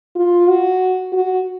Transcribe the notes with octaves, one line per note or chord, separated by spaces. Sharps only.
F4
F#4
F#4